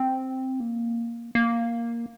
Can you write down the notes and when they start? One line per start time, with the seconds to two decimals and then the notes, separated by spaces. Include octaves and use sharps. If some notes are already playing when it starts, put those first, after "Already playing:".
Already playing: C4
0.60 A#3
1.35 A#3